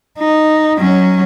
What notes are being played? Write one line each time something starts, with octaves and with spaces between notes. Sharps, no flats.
D#4
F#3 C#4